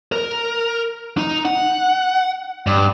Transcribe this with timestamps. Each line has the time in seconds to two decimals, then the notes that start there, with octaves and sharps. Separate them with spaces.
0.12 A#4
1.17 D#4
1.45 F#5
2.67 G2